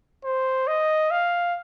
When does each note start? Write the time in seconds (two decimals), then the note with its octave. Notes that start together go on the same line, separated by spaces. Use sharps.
0.25 C5
0.67 D#5
1.11 F5